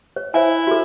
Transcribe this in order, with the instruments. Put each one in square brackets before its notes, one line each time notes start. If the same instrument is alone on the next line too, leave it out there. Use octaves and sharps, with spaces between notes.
[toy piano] C#5
[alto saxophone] E4 [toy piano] C5 E5 G#5
[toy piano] F#4 A4